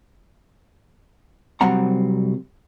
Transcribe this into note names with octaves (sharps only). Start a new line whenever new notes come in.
C2 F#3 G3 C4 F#5 A#5